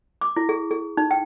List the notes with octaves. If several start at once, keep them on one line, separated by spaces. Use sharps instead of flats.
D6
E4
G#4
G#4
D#4
G5